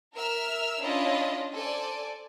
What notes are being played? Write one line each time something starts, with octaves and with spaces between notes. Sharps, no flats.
A#4 E5 E6 F6
C#4 D4 E4 F4 D#5
A4 C5 D5 G#5